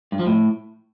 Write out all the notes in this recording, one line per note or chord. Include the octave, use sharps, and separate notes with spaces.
G2
F3
A2